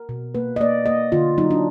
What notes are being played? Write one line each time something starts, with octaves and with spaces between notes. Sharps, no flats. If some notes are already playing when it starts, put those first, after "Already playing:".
Already playing: A#4
B2
A#3 B4
D#5
A#3 D5
A#3 D#5
D3 F4
F#3 D#4
D4